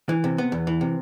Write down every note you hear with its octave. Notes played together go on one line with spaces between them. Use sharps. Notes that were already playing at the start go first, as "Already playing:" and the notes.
E3
C3
B3
E2
E3
C3